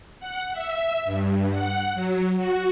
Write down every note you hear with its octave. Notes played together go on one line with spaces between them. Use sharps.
F#5
E5
G2
F#5
F#3
F#4